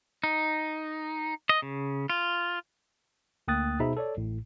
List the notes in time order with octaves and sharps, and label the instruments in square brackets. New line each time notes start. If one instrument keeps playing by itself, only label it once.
[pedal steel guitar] D#4
D#5
C#3
F4
[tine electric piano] D2 A#3 G5 D#6 F#6 A6
B2 D#4 G#4 C5 E5 B5
A4 C#5 D5
A1 A2